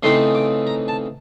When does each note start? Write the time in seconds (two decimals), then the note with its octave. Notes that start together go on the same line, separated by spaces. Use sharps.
0.03 C#3 E3 A3 C4 D#4 C6
0.35 D6
0.67 A#5
0.88 A5